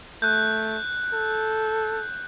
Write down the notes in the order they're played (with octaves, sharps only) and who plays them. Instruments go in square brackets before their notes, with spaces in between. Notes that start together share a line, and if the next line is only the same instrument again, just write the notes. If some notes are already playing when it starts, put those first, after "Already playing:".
[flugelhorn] A3 [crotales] F#6 G6
[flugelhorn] A4